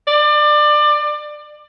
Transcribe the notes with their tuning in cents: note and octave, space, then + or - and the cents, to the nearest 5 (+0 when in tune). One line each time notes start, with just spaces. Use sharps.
D5 +25